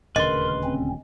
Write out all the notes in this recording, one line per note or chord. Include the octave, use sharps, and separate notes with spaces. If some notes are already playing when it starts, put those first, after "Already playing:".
D#1 D2 C#3 A#4 B4 D#5 C6
C4 C#4